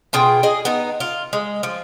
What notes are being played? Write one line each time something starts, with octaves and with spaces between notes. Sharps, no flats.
B2 F4 G#4 G5
G#4 D#5
B3 D#4
F4
G#3
F3